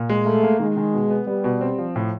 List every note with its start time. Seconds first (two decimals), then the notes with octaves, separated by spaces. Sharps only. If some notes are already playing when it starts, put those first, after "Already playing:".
Already playing: A#2
0.09 G#3
0.26 A3 A#3
0.43 A#3
0.60 D#3 G#3
0.77 D#3
0.94 B2
1.10 B3
1.27 G3 B3
1.44 B2
1.61 C4
1.78 F3
1.96 A2